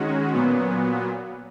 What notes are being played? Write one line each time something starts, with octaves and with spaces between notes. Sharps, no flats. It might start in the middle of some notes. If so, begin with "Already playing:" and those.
Already playing: D#3 G#3 C#4 F#4
A#2 F#3 B3